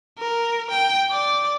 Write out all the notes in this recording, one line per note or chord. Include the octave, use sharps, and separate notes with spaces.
A#4
G5
D5